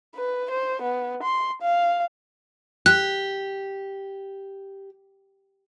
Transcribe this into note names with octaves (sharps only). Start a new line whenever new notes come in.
B4
C5
B3
C6
F5
G4 F#6